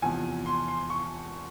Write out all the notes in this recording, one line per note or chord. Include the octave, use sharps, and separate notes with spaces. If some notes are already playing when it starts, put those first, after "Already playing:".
E2 C3 F3 G#5
C6
C6
C#6